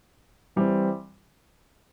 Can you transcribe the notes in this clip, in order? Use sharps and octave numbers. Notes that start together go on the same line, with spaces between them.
E3 G3 C4